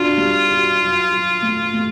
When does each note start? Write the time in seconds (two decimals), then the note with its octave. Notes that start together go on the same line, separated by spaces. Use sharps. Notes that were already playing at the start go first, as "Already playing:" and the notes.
Already playing: D4 F4 F#4
0.18 G3
0.49 F#4
0.80 F#3
1.11 F#3
1.42 A3
1.73 A3